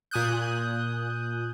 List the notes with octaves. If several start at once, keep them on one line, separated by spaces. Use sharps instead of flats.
A#2 G#5 D#6 F#6 G6